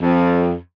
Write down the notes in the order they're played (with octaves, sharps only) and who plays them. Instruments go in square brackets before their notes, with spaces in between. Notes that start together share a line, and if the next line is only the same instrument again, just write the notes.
[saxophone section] F2